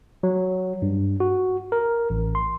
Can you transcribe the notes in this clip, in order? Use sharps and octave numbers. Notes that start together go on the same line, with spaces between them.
F#3
G2
F#4
A#4
A1
C6